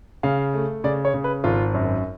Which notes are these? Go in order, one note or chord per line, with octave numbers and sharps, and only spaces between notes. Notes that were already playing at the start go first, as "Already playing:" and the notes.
C#3 F5
A3
C#3 D5
C#5
C#3
B4
G#1 F4
F#2